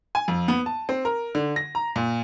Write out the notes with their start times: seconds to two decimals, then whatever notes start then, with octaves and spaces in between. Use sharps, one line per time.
0.15 G#5
0.28 F2
0.48 B3
0.66 A5
0.89 C4
1.05 A#4
1.35 D3
1.56 A#6
1.75 A#5
1.96 A#2